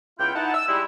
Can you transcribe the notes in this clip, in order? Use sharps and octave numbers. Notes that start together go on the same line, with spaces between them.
C#2 B3 E4 F4 G5
D#4 E4 F#5 A5
E6
G3 G#3 E4